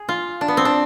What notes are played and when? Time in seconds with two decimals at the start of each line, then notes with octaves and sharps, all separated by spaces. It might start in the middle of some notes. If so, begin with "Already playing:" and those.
Already playing: G#4
0.09 F4
0.41 D4
0.48 B3
0.57 C4
0.65 D4